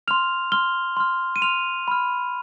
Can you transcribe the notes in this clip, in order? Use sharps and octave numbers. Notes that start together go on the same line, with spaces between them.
C6 F6 F7
C6 F6 G7
C6 F6
D#7
C6 F6 F7
B5 F6